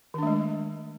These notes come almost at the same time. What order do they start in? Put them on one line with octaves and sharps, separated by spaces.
D#3 D4 A3 G#3